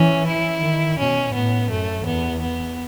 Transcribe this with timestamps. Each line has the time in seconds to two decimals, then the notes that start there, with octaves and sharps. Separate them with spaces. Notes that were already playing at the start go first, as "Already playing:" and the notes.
Already playing: E3 C#4
0.27 E4
0.63 D#3
0.99 B2 C#4
1.34 A2 B3
1.70 F#2 A3
2.06 E2 B3
2.42 B3